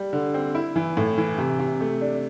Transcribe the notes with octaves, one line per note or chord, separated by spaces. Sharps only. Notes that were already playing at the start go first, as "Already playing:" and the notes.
Already playing: G3
D3
C4
E4
E3
A2
E3
C3
C3
A3
D4